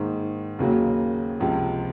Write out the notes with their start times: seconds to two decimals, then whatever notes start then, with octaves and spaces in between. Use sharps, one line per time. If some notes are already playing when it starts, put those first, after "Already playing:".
Already playing: G#2 D#3 A#3
0.59 D#2 C#3 F#3 A#3
1.40 C#2 C3 F3